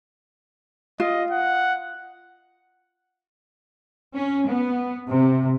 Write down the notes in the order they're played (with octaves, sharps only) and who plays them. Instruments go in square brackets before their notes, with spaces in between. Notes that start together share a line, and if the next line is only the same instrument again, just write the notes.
[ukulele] F4 [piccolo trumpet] D#5
[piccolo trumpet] F#5
[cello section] C#4
B3
C3